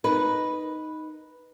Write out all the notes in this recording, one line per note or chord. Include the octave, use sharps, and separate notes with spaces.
D#4 B4